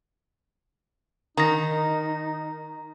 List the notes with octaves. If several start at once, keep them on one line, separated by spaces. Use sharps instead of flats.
D#3 D#4 A#5 A#6